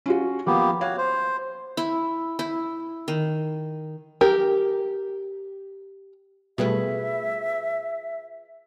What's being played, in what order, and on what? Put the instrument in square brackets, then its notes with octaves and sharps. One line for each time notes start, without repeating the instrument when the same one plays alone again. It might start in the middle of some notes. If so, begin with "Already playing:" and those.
[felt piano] C#4 F4 F#4
[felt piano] F3 [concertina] A#3 B3 G4
[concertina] F#4 C#5 [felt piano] F5
[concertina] C5
[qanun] E4
E4
D#3
[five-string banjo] G4 A#4
[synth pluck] B2 G3 A3 [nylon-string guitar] F4 G#4 B4 [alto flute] E5